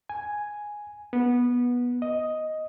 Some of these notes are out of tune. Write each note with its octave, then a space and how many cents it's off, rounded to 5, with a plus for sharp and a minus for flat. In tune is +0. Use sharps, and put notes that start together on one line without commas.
G#5 +0
B3 -15
D#5 +5